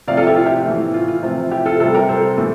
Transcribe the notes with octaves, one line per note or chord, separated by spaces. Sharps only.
C3 F3 A3 D5 F5
F4 A4
E4 G4
F4
E4 G4
A2 E3 A3
F4
F4
C3 F3 A3
E4 G4
F4 A4
C3 G3 F4 A4
G4 A#4
A4 C5
A2 E3